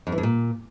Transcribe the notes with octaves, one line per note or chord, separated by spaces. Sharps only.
F2
E3
F2
A#2